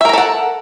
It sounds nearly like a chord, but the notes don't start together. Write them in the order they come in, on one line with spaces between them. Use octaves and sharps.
E5 A#4 A#5 A4 F#5